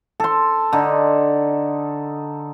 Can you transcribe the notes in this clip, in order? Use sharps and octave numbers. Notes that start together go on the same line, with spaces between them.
A4 C6
D3 D#4